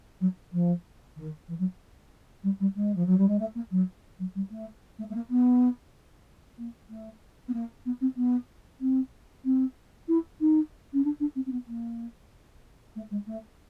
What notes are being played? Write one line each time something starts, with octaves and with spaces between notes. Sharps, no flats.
F#3
F3
D#3
E3
F#3
G3
G3
G#3
F3
F#3
G3
G#3
A3
A#3
F#3
F#3
G3
A3
A3
A3
A#3
B3
A#3
A3
B3
A#3
B3
C4
B3
C4
C4
E4
D#4
C#4
D4
D4
C4
C4
B3
A#3
A3
G#3
A3